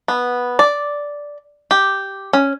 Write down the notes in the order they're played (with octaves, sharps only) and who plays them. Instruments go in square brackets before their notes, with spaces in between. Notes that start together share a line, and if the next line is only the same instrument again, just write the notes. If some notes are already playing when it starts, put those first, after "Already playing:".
[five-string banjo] B3
D5
G4
C#4